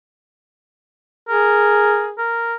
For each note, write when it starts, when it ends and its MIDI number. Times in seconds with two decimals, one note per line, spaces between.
1.29 2.17 68
1.29 2.09 70
2.18 2.57 70